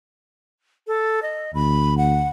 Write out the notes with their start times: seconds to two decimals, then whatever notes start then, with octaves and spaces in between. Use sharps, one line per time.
0.87 A4
1.23 D#5
1.55 D2 B5
1.98 F#5